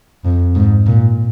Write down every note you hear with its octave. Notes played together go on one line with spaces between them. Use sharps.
F2
G#2
A#2